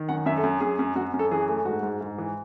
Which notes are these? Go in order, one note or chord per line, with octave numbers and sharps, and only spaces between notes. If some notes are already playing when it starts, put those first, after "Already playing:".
Already playing: D#3
F#2 F#5
F#2 E5
A4
F#2
F#2 G#4
F#2
F#2 F#4
F#2
A4
E3 G#4
A3
G#2 F#4
G#2
G#2
E3